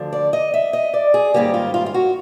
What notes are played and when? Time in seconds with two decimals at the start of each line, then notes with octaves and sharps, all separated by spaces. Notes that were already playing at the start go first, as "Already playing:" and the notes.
Already playing: D2 D3 F3
0.13 D5
0.33 D#5
0.54 E5
0.73 D#5
0.94 D5
1.14 G#4
1.34 G#2 D#3 G3 A#3 C#4 G4
1.54 F4
1.74 F4
1.86 F4
1.94 F#4